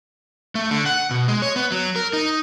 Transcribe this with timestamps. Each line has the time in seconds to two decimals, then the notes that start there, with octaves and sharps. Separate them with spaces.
0.55 A3
0.71 D3
0.86 F#5
1.11 B2
1.28 G#3
1.42 C#5
1.56 B3
1.72 F#3
1.96 A#4
2.13 D#4